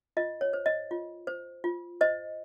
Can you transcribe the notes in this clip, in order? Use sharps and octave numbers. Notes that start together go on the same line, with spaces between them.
F4 D#5
C#5
C5
D#5
F4
C5
F4
C5 D#5